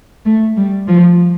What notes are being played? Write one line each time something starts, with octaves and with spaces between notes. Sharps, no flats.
A3
G3
F3